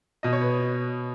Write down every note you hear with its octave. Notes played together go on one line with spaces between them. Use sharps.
B2 D#5
C#5
B4